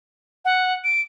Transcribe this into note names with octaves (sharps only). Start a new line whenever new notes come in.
F#5
D7